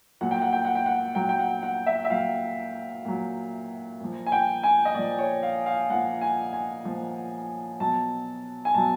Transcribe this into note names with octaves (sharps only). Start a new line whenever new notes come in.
A#2 F#3 F#5
G5
F#5
G5
F#5
G5
F#5
A#2 F#3 G5
G5
F#5
F#5
E5
E5
A#2 F#3 F5
A#2 F#3
A#2 F3
G#5
G5
G#5
D#5
A#2 F3 D5
C#5
F5
F5
A#2 F3 F#5
G#5
G#5
A#2 F3
B2 F#3 A5
G#5
B2 F#3 A5